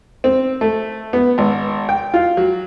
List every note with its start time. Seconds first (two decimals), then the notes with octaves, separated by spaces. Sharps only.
0.24 C4
0.61 A3
1.13 B3
1.38 G#1
1.89 G5
2.14 F4
2.37 F#3